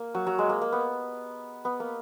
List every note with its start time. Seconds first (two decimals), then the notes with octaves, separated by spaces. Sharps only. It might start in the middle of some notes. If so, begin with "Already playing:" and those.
Already playing: A#3
0.15 F#3
0.27 F#3
0.38 G#3
0.49 A#3
0.61 A#3
0.72 B3
1.65 B3
1.80 A#3